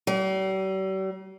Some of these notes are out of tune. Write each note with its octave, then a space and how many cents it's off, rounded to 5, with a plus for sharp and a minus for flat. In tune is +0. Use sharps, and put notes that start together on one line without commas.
G3 -45